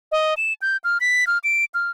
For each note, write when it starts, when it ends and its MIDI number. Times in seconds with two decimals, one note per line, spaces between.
0.12 0.34 75
0.37 0.53 100
0.62 0.77 91
0.84 0.98 89
1.01 1.27 95
1.27 1.38 89
1.44 1.65 98
1.74 1.91 89